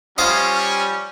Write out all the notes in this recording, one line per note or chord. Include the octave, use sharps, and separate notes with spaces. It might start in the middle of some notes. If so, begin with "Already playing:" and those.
G3 C#4 F4 C5 D#5